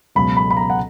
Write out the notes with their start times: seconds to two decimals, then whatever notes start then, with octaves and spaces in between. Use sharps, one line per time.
0.15 C#2 B2 F#3 B5
0.37 B5
0.51 B5
0.57 A#5
0.70 F#5